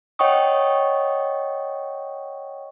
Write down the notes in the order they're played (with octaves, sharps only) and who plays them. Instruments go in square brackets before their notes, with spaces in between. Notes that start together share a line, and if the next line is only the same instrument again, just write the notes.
[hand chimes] C#5 D#5 F#5 G5 C#6 D#6